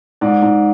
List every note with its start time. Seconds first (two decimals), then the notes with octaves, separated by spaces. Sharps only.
0.21 G#2 D5
0.42 G#2